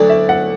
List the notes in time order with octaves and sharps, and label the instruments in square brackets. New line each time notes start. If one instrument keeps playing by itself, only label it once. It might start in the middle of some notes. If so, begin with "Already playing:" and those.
Already playing: [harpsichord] D2 D3 F#3 [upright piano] D5
[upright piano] E5
F#5